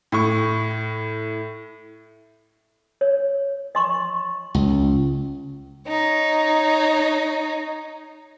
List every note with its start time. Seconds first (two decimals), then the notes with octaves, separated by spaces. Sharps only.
0.12 A2 C#6
3.01 C#5
3.75 D#5 C6 C#6
4.55 C#2
5.88 D#4 C#5